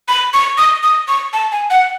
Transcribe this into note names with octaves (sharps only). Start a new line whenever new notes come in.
B5
C#6
D#6
D#6
C#6
A5
G#5
F#5